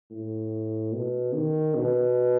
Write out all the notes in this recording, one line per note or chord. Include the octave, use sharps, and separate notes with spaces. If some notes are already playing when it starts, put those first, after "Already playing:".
A2
B2
D#3
B2